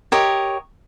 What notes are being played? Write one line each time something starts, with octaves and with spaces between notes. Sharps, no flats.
G4 A#4 C#5 D#5